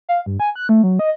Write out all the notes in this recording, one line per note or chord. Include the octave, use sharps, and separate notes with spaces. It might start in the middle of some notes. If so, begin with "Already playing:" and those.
F5
G2
G#5
F#6
A3
F#3
D#5